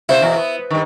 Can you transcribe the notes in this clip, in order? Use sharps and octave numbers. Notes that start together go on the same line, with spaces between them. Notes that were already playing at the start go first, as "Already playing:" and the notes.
C3 E4 C5
E2 B2
B3
G2 D#3